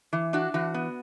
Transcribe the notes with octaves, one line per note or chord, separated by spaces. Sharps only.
E3
D4 F#4
E3 F#4
B3